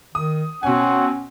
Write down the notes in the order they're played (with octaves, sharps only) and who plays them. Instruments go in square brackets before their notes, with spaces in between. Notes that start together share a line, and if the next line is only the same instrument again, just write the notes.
[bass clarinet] D#3 [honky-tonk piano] D#6
[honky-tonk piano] B2 G#5 [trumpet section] C4 C#5 F#5 [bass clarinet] C#4